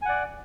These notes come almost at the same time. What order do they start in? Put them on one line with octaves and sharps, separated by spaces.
G#5 F#5 D5